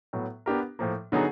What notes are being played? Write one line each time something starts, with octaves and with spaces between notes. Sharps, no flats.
A2 F#3 B3
B3 D4 G4 A#4
A2 F3 A#3
D3 F#3 B3 D#4 G#4